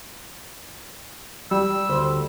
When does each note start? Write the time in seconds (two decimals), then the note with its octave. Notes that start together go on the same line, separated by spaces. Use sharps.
1.51 G3 E6
1.89 D2 C5